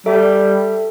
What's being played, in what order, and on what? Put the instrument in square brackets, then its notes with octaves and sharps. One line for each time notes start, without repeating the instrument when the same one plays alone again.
[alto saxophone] G3 [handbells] A4 E5